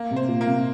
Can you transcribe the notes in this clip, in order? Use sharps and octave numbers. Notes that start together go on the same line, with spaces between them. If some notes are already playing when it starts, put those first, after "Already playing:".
Already playing: A#3
C3
C5
A#2
A#3
C3